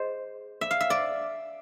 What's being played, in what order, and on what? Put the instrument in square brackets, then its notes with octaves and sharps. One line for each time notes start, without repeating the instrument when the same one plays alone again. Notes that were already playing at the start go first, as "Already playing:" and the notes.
Already playing: [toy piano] G#4 D#5 [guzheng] C5
[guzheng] E5
F5
E5
D5